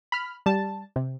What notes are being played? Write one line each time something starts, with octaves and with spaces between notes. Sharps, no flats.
B5 F6
G3 A5
C3